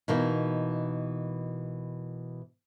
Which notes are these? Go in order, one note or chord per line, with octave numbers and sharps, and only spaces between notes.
B2 E3 A#3 D#4